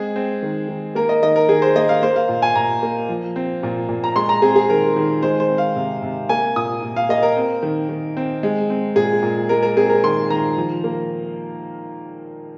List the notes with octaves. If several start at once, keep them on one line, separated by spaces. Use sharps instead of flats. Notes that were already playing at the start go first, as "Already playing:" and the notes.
Already playing: G#3 C4 G#4
C4
D#3
D#3
A#3 A#4
D#5
D#3 D#5
A#4
D#3 G#4
C5
A#3 D#5
F5
A#3 C5
F5
A#2
G#5
A#2 A#5
A#3
F3
C4
A#2
A#2
A#5
G#3 C6
A#5
C4 G#4
G#4
D#3 A#4
D#3
G#3 C5
C5
C4
F5
C3
C3
A#3 G#5
A#2 D#6
A#2
F5
A#3 D#5
A#4
C4
D#3
D#3
C4
G#3
C4
A#2 G#4
A#2
G#3 A#4
A#4
C4 G#4
A#4
D#3 C6
D#3 A#5
F3
A#3